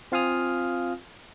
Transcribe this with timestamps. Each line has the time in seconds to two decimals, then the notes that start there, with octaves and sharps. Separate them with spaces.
0.12 C4 F4 F5 G#5 D#6 F6